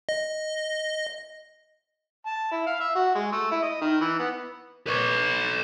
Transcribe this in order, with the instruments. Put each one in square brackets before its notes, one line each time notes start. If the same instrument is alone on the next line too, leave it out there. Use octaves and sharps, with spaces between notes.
[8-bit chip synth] D#5
[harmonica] A5
E4
F5
E5
F#4
G#3
A3
E4
D#5
D#3
E3
B3
[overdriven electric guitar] B4 C#5